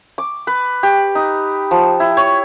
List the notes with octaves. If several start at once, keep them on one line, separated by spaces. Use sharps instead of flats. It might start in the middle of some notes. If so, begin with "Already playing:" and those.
D6
B4
G4
D#4
F3
E4
C#5